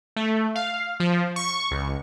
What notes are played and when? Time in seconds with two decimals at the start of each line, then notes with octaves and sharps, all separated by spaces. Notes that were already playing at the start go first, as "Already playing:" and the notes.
0.16 A3
0.55 F5
1.00 F3
1.36 C#6
1.71 C#2